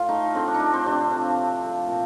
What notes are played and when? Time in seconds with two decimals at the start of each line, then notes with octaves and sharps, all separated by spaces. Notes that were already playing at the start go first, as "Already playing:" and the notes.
Already playing: A2 F4
0.08 A3 D#4
0.35 D3 C4
0.48 D4
0.54 D#4
0.60 A3 D4
0.74 C4
0.85 C3 D4
1.11 F3 A3
1.37 C3
1.62 F3 A3
1.88 A#2